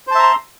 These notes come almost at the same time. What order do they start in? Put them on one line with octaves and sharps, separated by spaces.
C5 A5 E5 A#5 C6